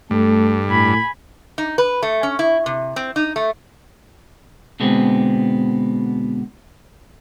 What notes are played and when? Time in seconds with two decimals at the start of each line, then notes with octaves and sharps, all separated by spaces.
0.11 G2 A3 A4
0.69 A2 G#5 B5
1.58 D#4
1.78 B4
2.03 A3
2.23 C#4
2.39 E4
2.66 C3
2.96 C4
3.16 D#4
3.36 A3
4.80 B2 D3 G#3 B3 C4